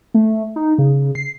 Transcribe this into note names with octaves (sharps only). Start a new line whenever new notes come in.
A3
D#4
C#3
C7